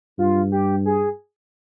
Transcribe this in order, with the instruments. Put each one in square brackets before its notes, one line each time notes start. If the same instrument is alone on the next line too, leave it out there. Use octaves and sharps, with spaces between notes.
[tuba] G2 [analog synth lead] F4
[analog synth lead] G4
G#4